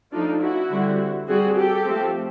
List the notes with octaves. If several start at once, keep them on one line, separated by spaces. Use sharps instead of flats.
F3 A3 D4 D#4 F4
E4 F#4
D3 G3 C4
G3 C4 F#4 G#4
G4 A4
F3 A3 C4